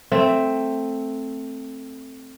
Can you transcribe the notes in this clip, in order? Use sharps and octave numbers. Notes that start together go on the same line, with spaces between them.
A3 C4